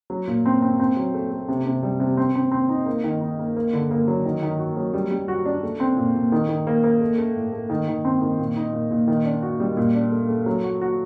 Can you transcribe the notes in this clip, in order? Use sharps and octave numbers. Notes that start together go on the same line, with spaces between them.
F#3
A#2
C4
C4
C4
F#3
A3
A3
C3
C3
G3
C3
C4
C4
C4
D#4
A#3
D#3
D#4
A#3
A#3
D3
A#3
F#3
D#3
D#3
F#4
F#3
G3
G3
F#4
D4
A3
C4
A#2
A#2
D#3
D#3
A#3
A#3
A3
A3
A2
A3
D#3
D#3
C4
D#3
A#2
D#4
A#2
A#2
D#3
D4
F#4
G3
A#2
D4
A3
A3
F#3
F#4
F#4